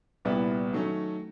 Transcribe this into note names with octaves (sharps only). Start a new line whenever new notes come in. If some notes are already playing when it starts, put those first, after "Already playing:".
C2 A#2 G3 B3 E4
D#3 F#3 A3 C#4